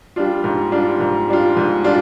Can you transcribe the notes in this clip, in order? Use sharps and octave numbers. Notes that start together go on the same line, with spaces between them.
G3 D4 F4
G#2
G3 D4 F4
G#2
G3 D4 F4
G#2
G3 D4 F4